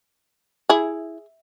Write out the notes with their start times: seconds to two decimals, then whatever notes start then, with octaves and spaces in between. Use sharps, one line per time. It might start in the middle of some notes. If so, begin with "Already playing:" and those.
0.69 E4 G#4